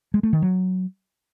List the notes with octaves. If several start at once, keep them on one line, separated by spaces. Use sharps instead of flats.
G#3
A3
D#3
F#3